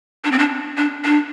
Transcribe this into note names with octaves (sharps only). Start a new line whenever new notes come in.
D4
C4
D4
D4
D4